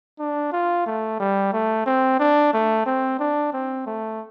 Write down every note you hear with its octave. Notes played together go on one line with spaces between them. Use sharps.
D4
F4
A3
G3
A3
C4
D4
A3
C4
D4
C4
A3